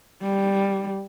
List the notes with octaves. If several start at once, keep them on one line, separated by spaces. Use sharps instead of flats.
G3